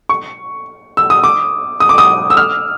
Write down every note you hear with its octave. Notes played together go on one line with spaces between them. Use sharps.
C#6
E6
D#6
D6
D#6
D6
D#6
E6
F6